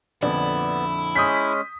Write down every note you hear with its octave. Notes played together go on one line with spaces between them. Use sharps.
A#1 F2 D3 B3 E4 D5
G#3 C#4 D#6 G6 B6